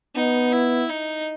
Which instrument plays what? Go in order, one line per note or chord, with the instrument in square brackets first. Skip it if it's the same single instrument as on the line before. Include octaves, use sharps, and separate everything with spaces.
[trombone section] B3 [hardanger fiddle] D#4
[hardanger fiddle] E4
D#4